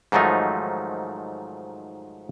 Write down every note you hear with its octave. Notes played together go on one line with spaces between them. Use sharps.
G#2 D#3 F3 F#3 A3 D#4